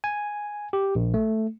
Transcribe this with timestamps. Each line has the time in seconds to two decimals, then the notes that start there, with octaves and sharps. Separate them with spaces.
0.04 G#5
0.73 G4
0.95 A#1
1.14 A3